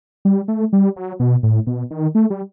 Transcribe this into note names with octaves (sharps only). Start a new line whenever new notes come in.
G3
A3
G3
F#3
B2
A2
B2
D#3
A3
G3